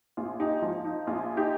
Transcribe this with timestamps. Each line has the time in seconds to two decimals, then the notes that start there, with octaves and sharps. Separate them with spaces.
0.17 A#1 F4
0.40 D#4 G4
0.62 F3 F4
0.85 D#4
1.07 A#1 F4
1.37 D#4 G4